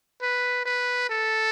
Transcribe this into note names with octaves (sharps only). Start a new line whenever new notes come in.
B4
B4
A4